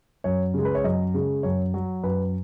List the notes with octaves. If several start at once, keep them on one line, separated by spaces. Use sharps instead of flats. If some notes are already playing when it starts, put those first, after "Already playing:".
F#2 C#5
C#3 G#3
B4
C#5
F#2 D#5
C#3 G#3
F#2 C#5
F#3
F#2 B4